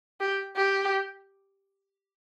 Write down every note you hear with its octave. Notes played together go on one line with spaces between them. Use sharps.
G4
G4